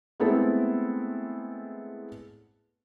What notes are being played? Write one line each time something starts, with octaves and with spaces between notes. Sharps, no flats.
G#3 A3 B3 C4 E4 A4